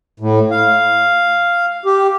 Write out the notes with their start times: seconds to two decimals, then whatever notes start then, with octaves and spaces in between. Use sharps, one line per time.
0.20 A2
0.50 F5
1.86 G4